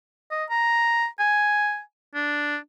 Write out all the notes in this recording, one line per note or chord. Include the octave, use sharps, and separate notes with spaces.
D#5
A#5
G#5
D4